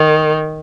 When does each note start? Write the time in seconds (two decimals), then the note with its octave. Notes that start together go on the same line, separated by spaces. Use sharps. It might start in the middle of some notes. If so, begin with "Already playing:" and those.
Already playing: D#3